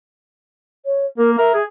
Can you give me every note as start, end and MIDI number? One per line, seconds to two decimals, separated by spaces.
0.86 1.06 73
1.18 1.36 58
1.18 1.31 70
1.38 1.50 70
1.38 1.58 76
1.54 1.63 68